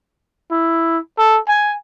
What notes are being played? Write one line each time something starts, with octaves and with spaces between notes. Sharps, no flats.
E4
A4
G#5